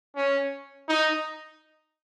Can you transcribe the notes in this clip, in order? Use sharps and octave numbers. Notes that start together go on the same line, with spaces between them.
C#4
D#4